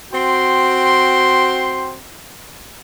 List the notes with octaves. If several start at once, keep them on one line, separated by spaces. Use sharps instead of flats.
C4 F#4 G5 C6